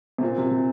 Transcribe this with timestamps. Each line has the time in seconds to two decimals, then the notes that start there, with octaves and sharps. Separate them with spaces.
0.18 C3
0.23 A#2 C4
0.38 C3
0.51 C3